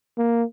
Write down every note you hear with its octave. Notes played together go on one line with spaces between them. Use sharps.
A#3